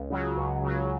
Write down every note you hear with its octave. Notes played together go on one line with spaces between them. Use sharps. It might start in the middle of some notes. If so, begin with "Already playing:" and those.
Already playing: C#2
C#3 F#3
C#2
C#3 F#3